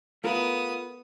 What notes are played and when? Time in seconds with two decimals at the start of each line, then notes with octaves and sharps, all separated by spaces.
0.24 A3 B3 F4 A#4 D#6